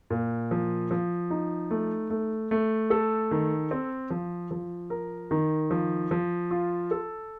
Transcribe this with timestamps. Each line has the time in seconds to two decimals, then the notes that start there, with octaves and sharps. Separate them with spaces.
0.10 A#2
0.51 F3
0.91 F3
1.30 D#4
1.71 A3
2.10 A3
2.51 A3
2.90 A4
3.31 D#3
3.71 C4
4.10 F3
4.51 F3
4.90 A#4
5.31 D#3
5.71 F3
6.11 F3
6.51 F4
6.91 A4